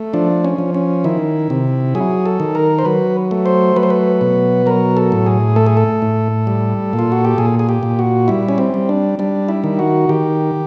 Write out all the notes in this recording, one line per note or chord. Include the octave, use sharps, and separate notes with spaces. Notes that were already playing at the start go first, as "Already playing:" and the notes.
Already playing: A3
F3 D4
C#4
F3
C#4
D#3 E4
C3
F#3 G#4
A4
D#3
A#4
C5
F#3 B4
A3
C5
F#3 B4
C5
B4
B2
F#3 A#4
A4
A2
G#4
A3 A4
G#4
A4
A2
G3
A#2
F4
F#4
G4
A#2 G#4
G#4
G4
A#2
F#4
G3 E4
C#4
C4
G3
D4
G3 D4
E4
D#3
F#4
D#3 G4